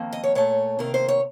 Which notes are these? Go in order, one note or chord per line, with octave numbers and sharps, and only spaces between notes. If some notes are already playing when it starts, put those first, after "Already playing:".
Already playing: F2 D#3 A#3
D#5
C#5
A#2 A3 C#5
C3 D#3 A#3 A#4
C5
C#5